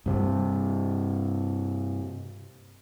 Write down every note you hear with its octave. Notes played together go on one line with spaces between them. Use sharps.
G2 C3